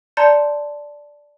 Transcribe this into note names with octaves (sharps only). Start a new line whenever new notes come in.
D5 A5 A#5 C6 G6 C#7